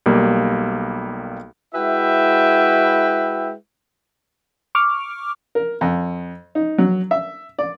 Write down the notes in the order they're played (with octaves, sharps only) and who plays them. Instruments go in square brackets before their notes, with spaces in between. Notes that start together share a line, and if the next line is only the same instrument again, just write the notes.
[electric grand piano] B1 G3 A#3
[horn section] G#3 E4 F#4 B4 E5 G5
[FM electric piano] C#6 D6 F6
[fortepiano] A#4
F2
D#4
F#3
E5
D5